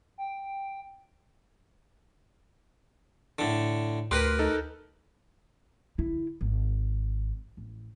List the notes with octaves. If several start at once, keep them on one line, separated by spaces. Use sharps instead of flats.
G5
A2 D3
D2 G4 A#4 B4 C6 F6 F#6
D#4 A4
D3 E4
G#1
A1